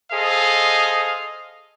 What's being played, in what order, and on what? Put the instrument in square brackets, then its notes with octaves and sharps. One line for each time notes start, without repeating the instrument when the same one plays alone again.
[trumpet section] G#4 A4 C5 D#5 F5